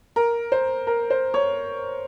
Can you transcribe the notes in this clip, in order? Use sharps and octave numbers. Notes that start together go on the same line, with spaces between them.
A#4
C5
A#4
C5
C#5